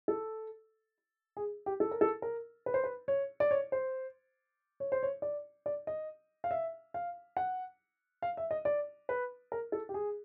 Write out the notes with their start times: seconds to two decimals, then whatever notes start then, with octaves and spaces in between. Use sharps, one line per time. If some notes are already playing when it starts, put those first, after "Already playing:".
0.08 A4
1.37 G#4
1.66 G4
1.80 A4
1.91 A#4
2.01 A4
2.22 A#4
2.66 B4
2.74 C5
2.84 B4
3.08 C#5
3.40 D5
3.51 C#5
3.72 C5
4.80 C#5
4.92 C5
5.03 C#5
5.22 D5
5.66 D5
5.87 D#5
6.44 F5
6.51 E5
6.94 F5
7.37 F#5
8.22 F5
8.37 E5
8.51 D#5
8.65 D5
9.09 B4
9.52 A#4
9.72 A4
9.89 G4
9.94 G#4